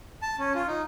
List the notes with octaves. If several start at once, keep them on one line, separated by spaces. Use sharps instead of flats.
A5
C#4
F4
D#4